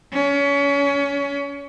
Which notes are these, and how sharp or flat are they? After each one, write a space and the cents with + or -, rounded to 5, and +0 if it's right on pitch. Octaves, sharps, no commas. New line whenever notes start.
C#4 +30